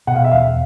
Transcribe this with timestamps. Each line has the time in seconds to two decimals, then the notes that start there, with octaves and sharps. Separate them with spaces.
0.07 B2 F#5
0.16 F5
0.24 E5
0.31 E2 F5